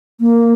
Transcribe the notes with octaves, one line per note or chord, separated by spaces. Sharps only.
A#3